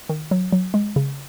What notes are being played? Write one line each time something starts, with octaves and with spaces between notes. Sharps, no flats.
D#3
F#3
F#3
G#3
C#3